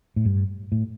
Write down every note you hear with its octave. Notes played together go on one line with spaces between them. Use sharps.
A2
G2
A2